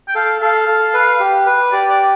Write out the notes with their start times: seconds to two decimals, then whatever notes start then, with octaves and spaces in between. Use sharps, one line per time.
0.08 G5
0.15 A4 F5
0.42 A4 F5
0.68 A4
0.94 B4
1.20 G4
1.46 B4
1.72 G4 D5
1.90 D5